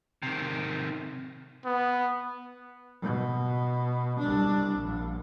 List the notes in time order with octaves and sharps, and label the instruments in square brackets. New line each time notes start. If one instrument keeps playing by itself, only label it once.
[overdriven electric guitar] C3 D#3
[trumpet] B3
[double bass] B2
C2 D4
A#1